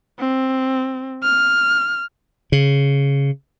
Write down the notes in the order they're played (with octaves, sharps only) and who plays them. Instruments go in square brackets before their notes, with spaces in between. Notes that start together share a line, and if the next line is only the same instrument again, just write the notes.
[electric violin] C4
F6
[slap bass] C#3